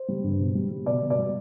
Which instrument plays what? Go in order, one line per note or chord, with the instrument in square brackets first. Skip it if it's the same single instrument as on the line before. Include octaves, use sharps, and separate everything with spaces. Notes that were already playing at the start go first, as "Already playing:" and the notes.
Already playing: [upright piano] C5
G3
G2
B2
G3
G3
B2 D5
B2
D5
G3